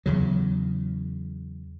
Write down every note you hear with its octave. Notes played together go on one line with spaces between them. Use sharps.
E2 C#3 F#3